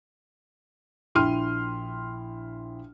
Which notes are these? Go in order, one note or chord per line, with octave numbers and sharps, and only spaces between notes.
A#1 E4 G5 C6 F6 D#7